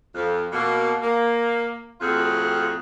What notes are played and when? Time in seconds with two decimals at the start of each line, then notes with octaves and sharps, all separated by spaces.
0.15 F2
0.52 B2 A#3
1.00 A#3
2.00 F2 A2 F4 F#4 G#4